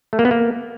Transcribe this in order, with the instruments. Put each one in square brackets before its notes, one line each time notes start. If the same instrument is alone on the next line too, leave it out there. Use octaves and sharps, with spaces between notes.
[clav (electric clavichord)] A3
A#3
B3
A#3